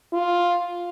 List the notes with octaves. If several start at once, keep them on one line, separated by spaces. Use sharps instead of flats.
F4